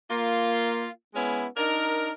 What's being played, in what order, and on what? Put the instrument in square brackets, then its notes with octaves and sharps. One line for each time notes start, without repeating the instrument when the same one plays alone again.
[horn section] A#3 F4
G#3 B3 C#4 E4
D4 D#4 A#4